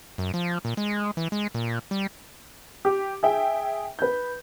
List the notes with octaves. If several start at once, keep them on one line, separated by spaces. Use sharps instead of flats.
F#2
F3
A#2
G#3
E3
G#3
A#2
G3
G4
G#4 E5 G5
B4 G6